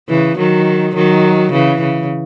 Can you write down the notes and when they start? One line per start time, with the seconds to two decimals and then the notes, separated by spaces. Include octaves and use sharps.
0.09 C#3 E3
0.38 D#3 F#3
0.95 D#3 F#3
1.52 C#3 E3
1.81 C#3